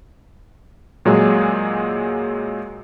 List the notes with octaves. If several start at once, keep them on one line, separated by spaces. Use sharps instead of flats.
A#2 F#3 G#3 G#4